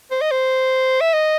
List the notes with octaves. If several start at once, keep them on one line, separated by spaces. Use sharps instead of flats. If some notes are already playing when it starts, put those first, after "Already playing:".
C5
D#5
C5
E5
D#5